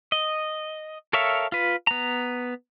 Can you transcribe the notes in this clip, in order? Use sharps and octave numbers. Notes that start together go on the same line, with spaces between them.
D#5
A4 A#4 C#5 E5 F5
F4 B4
B3 A#5